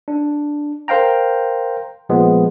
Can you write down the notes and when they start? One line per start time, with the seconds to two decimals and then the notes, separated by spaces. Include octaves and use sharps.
0.08 D4
0.88 A#4 C5 F5 G5 A#5
2.09 A#2 F3 G#3 B3